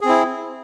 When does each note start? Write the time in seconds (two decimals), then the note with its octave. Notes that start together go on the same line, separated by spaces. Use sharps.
0.01 G#4
0.05 C4
0.09 E4